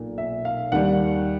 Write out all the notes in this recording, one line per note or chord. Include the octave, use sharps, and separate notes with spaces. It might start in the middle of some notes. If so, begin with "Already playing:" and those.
Already playing: B1 A#2
E5
F5
D#2 D#3 G3 F#5